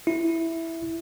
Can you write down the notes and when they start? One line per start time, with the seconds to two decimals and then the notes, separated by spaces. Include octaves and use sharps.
0.07 E4